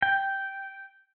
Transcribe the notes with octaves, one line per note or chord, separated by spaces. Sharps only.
G5